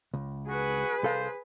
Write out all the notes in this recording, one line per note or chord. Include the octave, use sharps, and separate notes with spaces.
C#2
F#4 G#4 B4
C2 A4 C5 F5